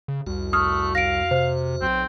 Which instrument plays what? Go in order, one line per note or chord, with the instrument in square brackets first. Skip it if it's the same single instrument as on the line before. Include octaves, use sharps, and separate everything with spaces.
[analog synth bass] C#3
[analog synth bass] C2 [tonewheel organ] F2 F#4
[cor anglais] A3 [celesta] D#6 F6
[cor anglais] F5 [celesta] A#6 D7
[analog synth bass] C3 [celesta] C5
[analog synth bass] B1 [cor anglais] C4